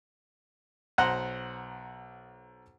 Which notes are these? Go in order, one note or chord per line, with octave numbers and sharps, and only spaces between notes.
B1 C5 F#5 A#5